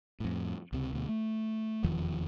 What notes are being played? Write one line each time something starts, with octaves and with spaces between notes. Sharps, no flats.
F2 A2
C#2 C3
D2 B2
A3
F1 E2 D#3 F3